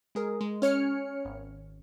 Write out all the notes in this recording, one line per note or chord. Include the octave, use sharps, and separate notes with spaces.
G#3 G#4 A#4
G#3
C#4 C#5 F6 C#7
G#1